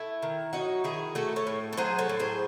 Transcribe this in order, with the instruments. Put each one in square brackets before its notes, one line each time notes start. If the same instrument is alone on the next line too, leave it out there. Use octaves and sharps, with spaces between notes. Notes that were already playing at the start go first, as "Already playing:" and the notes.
Already playing: [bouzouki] A3 E4
D#3
F#3 D#4 F#4
D#3 E4 G#4
A3 F#4 A4
A4 C#5
A2
A4
F#3 G#4 C5
A4 C#5
A2
G#4 C5